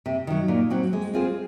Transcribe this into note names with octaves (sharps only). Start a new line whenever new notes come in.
C3
D#3 F#3
A#2
F#3 C4 F#4
G#3
C4 F4 G#4 C5